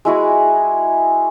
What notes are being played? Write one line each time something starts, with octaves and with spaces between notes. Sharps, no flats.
G#3 E4 F#4 G#4